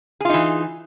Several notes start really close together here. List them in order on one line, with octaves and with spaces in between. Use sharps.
G#4 F4 D#4 E3